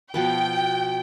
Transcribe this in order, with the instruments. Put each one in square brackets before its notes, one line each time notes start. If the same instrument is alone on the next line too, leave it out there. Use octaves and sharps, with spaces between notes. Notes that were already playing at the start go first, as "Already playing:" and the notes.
[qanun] B2 F3 B4 [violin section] G5